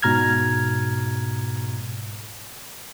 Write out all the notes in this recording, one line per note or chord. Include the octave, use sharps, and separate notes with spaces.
G#2 B2 A#5 F6 G#6